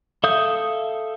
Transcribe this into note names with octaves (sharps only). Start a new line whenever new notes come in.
A4 E5 F5 D#6 G6